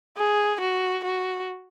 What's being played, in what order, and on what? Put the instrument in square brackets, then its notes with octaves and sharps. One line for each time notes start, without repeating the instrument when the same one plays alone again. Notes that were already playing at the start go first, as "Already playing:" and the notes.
[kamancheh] G#4
F#4
F#4